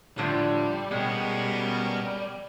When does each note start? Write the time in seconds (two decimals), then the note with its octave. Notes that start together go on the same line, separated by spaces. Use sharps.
0.18 A2 D3 F3 G3
0.91 B2 G#3 B3 C#4 A#4